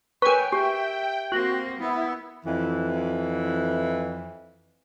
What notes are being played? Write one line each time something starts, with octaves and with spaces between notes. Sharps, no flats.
A#4 B4 C#5 G5 G#5 C#6
G4 E5
A#3 C4 F#4
B3 E4
F2 E3